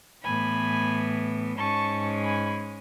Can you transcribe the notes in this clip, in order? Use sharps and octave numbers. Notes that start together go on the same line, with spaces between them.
A2 E3 B3 G#5 B5
G#2 G#3 C#4 A5 C#6
G#5 B5